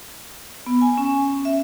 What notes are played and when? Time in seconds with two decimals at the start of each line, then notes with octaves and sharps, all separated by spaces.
0.66 B3
0.81 G#5
0.98 C#4
1.45 E5